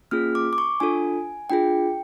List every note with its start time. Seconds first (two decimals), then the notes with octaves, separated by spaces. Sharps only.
0.11 A#3 C#4 F4 G#4 F6
0.35 D6
0.53 D6
0.58 C#6
0.80 D4 F4 A4 G#5
1.50 D4 F4 G#4 G5